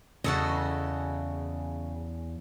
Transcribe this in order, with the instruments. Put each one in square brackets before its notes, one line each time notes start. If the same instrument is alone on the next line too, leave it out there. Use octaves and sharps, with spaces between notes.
[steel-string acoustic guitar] E2 [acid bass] C#3 [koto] F#4 A4 D#5